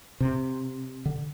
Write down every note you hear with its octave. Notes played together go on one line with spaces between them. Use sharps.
C3
D3